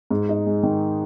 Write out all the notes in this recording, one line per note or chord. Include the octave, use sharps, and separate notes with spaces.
G#2
D#4
G#3
D#3